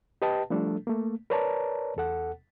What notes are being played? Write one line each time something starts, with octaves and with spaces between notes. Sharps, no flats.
G4 B4 D#5 G5 A5
F3 G3 A3 D4 A4
A3 A#3
A#4 B4 C#5 D5 A5 A#5
E2 A4 F#5